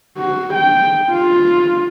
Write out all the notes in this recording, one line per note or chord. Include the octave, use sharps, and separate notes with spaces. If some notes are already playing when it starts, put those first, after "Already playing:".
F#4
G5
F4